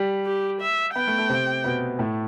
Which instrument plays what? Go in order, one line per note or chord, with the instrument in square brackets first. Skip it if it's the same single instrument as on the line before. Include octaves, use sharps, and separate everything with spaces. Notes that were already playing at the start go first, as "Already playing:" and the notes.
Already playing: [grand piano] G3 G4
[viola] G4
E5
[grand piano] B3 B4 [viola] G5
[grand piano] A3 A4
A3 A4
C3 C4
B2 B3
A2 A3